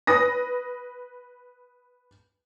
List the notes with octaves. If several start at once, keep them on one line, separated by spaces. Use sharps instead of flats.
B4 D#6 A#6